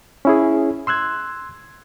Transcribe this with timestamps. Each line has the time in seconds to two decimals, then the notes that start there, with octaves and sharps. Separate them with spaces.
0.25 C#4 E4 G#4
0.87 C6 E6 F#6 G#6